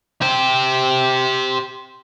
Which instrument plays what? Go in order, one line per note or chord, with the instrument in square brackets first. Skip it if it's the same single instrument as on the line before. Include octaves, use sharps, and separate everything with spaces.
[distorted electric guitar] G4 C5